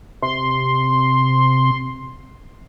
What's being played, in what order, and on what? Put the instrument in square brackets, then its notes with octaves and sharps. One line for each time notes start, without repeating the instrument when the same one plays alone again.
[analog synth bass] C3 [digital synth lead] C6